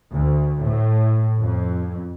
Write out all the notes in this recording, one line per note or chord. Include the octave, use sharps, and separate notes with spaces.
D2
A2
F2